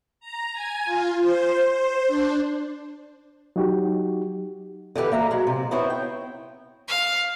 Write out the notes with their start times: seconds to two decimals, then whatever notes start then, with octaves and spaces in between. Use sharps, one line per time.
0.20 A#5
0.53 G#5
0.85 F4
1.20 C5
1.69 C5
2.08 D4
3.56 F#3 D#4 F#4 G4
4.95 D3 E3 G4 B4
5.12 A#3 E5 A#5
5.31 F#3 G#3
5.47 C3
5.71 B3 C4 E4 C#5
5.90 G5
6.88 F5